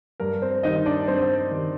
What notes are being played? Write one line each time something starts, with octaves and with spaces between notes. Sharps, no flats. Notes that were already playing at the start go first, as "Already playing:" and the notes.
G2 A#4
C4 C5
D#3 G3 D#4 D#5
D4 D5
G2 C4 C5
D#3 G3